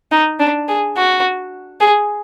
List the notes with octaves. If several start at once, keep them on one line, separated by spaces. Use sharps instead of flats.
D#4
D4
G#4
F#4
G#4